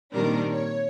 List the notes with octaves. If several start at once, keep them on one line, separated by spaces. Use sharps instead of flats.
A#2 D#3 G3 C4 D4 A#4
C#5